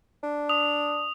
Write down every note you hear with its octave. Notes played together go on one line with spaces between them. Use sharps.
D4
D#6 F7